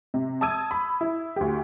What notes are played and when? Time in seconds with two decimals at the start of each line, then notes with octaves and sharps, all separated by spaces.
0.14 C3
0.41 A5 D#6 E6 G#6 D#7
0.71 B5
1.01 E4
1.36 D2 G4